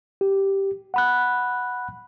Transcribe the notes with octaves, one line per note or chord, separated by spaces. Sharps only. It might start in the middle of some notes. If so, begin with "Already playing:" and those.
G4
F#5 B5 F#6